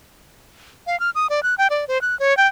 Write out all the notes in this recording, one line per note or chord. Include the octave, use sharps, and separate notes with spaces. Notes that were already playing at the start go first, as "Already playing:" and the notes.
F5
F6
D#6
D5
F#6
G5
D5
C5
F#6
C#5
G5